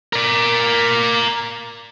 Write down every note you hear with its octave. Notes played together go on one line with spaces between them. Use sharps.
A#4 D5